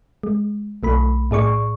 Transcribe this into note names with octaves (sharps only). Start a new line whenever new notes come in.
G#3
B1 A3 B5
A2 G#4 D5 C#6